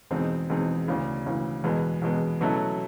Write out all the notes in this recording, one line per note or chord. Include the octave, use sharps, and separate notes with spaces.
E2 B2 G#3 C4 D#4
E2 B2 G#3 C4 D#4
D2 C#3 E3
D2 C#3 E3
E2 B2 G#3 B3
E2 B2 G#3 B3
B2 F#3 A3 C#4 E4